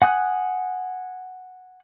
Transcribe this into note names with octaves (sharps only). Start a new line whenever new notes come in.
F#5 G#5 D#6 F#6